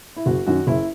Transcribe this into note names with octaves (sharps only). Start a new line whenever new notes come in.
E4
F#1 F#4
F#2 D#3 F#4
F#1 E4